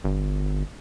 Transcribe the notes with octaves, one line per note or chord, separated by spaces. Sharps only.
G1